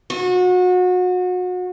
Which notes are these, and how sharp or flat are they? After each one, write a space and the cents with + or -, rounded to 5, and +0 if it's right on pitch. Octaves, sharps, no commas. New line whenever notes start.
F#4 -30